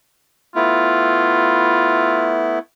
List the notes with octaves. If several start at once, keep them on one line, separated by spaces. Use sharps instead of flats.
A3 B3 E4 F4